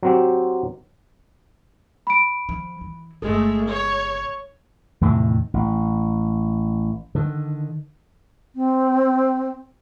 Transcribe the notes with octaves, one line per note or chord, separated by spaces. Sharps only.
F#3 C4 G4
B5 D7
F3
E3
G1 C#3 G#3 A3 A4
C#5
E2 A2 C3 D#3
A1
D3 D#3
C4